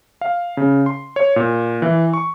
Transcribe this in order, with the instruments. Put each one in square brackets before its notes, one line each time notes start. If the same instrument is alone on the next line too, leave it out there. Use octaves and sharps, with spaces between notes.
[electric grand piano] F5
C#3
C6
C#5
A#2
E3
C#6